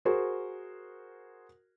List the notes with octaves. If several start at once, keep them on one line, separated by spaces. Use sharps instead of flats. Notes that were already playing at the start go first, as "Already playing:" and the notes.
F#4 G#4 A#4 C5